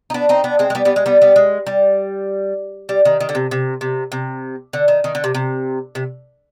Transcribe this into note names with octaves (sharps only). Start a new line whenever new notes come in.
D#4
B3 D4
C4 D#4
B3 D4
G#3 C4
G#3
G3 B3
G3 B3
G#3
G3 B3
G3 B3
G#3
G3
G3
D#3
D#3
D3
C3
C3
C3
C3
D3
D#3
D#3
D3
C3
C3
C3